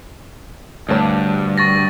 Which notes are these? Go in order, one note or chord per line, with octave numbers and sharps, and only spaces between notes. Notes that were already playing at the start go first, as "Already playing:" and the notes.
D2 G2 C#5 A5
C#6 A6 A#6